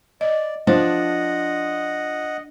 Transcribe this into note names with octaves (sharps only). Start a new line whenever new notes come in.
D5 D#5
F3 D4 C5 D#5 F#5